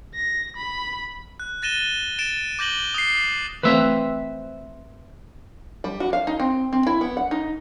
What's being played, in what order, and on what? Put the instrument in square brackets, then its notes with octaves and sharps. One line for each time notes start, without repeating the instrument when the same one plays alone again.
[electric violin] A#6
B5
[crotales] F#6
F#6 A6 A#6 D#7 E7 G7
A6 D7 E7
D6 G6 A#6 F#7 G7
D#6 G6 C7
[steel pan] E3 A3 C4 [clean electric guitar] B4 C5 E5
[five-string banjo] G3
F#4
F5
D#4
C4
C4
E4
B3
F#5
D#4